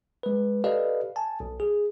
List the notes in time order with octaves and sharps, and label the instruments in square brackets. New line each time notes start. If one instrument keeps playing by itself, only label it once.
[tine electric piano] G#3 B4
G4 A4 B4 D5 D#5 F5
G#5 A5
B1
G#4